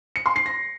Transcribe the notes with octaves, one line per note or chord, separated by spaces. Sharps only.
C#7
C6
C7
A#6